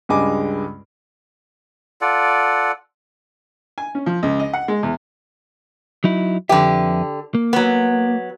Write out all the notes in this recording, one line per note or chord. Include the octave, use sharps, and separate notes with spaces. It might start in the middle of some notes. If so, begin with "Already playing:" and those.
C#2 G2 G#3 D#5 G#5 D6
F4 A4 D5 F#5
G#5
C#4
F3
C#2
D#5
F#5
G#3
E2
F#3 D#4 E4
F2 D3 G4 B4 E5
A#3
F#3 B3